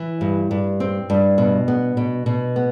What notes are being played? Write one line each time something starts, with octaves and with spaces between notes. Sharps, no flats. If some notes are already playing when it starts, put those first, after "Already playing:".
Already playing: E3
G2
G2
C4
G2
B2
B3
B2
B2
B3